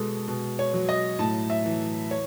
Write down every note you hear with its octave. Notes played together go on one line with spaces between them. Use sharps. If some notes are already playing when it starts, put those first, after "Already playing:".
Already playing: B2 G#3 A4
B2
C#5
F#3
D#5
A2 A5
E5
E3
C#5